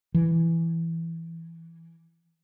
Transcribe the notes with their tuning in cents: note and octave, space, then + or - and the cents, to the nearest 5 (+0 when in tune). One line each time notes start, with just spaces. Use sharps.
E3 +5